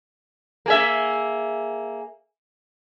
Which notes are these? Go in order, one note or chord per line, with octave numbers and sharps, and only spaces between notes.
A#3 G#4 E5